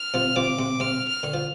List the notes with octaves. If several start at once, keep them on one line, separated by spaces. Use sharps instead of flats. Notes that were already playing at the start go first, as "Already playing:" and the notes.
Already playing: F6
C3 F3
C3 F3 D6
C3
C3 F6
F6
D3
F3